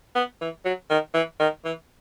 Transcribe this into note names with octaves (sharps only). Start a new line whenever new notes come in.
B3
E3
F#3
D#3
E3
D#3
E3